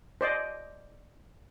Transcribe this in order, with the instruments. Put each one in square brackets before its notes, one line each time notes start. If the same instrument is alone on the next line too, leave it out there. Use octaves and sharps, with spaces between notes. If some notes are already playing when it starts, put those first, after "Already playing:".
[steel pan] C5 D5 D#5